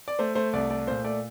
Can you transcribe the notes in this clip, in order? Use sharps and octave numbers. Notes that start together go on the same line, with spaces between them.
D5
A3 C5
A3 C5
C2 D5
A3 D5
A#2 C5
A3 D5